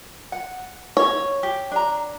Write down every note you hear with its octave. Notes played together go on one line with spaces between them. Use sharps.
F#5
C#5
G4
D4 A#5